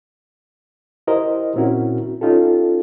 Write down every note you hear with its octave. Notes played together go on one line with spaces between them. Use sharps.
E4 G4 A#4 C5 D#5
A#2 C4 C#4 E4 F#4 A#4
C#4 D#4 F4 G4 A4